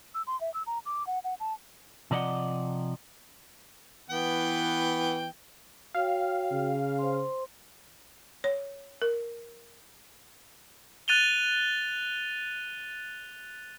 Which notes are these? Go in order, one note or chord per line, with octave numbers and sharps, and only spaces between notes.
E6
C6
E5
E6
A#5
D6
F#5
F#5
A5
C3 F3 D5 D#5 F#5
E3 B3 G5
F#4 C#5 F5 G5
C#3
C5 C6
C#5
A#4
F#6 A6 D#7 F7 G7